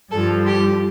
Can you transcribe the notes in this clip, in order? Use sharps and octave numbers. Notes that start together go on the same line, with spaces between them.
G2 F3 A4
G4